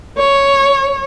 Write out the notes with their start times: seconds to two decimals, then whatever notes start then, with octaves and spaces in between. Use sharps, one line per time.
0.18 C#5